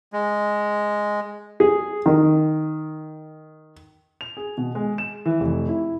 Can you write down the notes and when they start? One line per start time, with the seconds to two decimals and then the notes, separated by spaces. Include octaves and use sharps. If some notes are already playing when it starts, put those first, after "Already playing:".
0.13 G#3
1.60 G#4
2.06 D#3
4.21 F7
4.37 G#4
4.58 B2
4.75 G#3
4.98 E7
5.26 E3
5.40 F1
5.69 E4